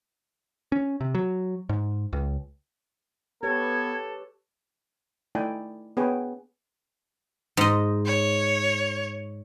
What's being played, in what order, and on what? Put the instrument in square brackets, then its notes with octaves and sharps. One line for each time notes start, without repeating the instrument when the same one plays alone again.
[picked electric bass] C#4
C3
F#3
G#2
C#2
[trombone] B3 [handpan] G4 B4 C#5 [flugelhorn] A4 [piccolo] G#6
[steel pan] A3 D#4 E4 D5 G5 G#5
B3 D4 G#4 B4 C#5 G5
[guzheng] G#2 D#5
[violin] C#5